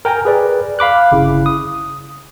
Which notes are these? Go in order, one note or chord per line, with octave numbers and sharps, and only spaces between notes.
A#4 G5 G#5 A#5
G#4 B4 D5
F5 B5 D6 F#6
G1 C#3 E4
D#6